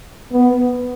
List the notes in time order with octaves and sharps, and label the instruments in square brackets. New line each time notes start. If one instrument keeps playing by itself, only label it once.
[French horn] B3